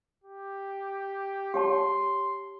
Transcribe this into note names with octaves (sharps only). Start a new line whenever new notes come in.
G4
G4 C#5 A5 C6